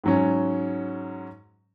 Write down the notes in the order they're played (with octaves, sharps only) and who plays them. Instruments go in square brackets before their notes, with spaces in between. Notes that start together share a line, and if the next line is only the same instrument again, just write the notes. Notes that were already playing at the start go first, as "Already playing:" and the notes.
[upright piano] G#2 F#3 C#4